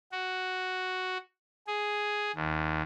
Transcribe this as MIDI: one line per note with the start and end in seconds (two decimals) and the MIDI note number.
0.12 1.18 66
1.67 2.32 68
2.36 2.82 39